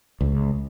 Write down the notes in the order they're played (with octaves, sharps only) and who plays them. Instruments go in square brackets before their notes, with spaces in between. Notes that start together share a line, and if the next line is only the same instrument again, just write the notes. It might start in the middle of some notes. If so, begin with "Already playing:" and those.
[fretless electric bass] C#2